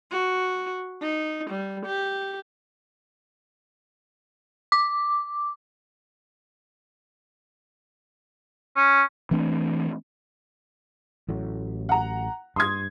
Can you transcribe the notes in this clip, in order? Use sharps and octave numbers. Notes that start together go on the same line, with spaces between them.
F#4
D#4
G3
G4
D6
C#4
E3 A3 C4 D4
A1 A2 F#3
F#5 A#5
G2 C6 D#6 G#6